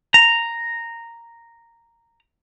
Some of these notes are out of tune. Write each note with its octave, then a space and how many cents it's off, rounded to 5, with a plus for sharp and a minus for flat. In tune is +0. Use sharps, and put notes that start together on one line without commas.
A#5 -5